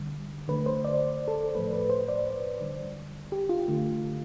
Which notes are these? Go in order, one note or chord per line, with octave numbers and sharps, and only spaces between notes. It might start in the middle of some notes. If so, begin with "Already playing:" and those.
Already playing: D3 G3
D3 A3 B4
C5
D5
A4
A2 F3 A3 B4
B4
C5
D5
D3 G3
G4
F4
D3 A3